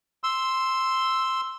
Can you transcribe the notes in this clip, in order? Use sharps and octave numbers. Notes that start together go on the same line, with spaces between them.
C6 E6